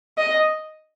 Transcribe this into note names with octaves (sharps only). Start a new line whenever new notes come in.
D#5